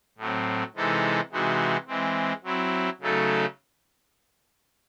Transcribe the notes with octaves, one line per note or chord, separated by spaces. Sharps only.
A2 F#3 C4
C3 E3 G#3 D#4 A4
C3 E3 G#3 D#4 F#4
E3 G#3 C4
F#3 C4 E4
C#3 F#3 A3 D#4 A4